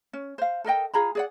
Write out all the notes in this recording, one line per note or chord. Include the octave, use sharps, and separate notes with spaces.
C#4
C5 F5
A4 A#4 D#5 G5
F4 G#4 A#5 B5
G#4 D5 F#5